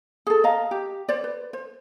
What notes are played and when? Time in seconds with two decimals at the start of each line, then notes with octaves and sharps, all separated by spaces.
0.27 G#4 A4
0.44 D#5 F5 A#5
0.71 G4
1.09 C5 D5
1.24 B4
1.53 C5